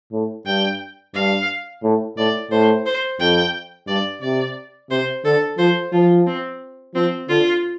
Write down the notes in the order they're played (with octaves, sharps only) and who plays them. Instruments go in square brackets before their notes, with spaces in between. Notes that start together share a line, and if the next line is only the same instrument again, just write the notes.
[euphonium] A2
[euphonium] G2 [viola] G5
[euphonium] G2 [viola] F5
[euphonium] A2
[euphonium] A2 [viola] D5
[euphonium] A2 [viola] C5
[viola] C5
[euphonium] F2 [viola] G5
[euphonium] G2 [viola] D5
[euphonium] C3 [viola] D5
[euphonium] C3 [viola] C5
[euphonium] D3 [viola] A4
[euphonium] F3 [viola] C5
[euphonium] F3 [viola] F4
[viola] C4
[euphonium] F3 [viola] C4
[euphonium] D3 [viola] F4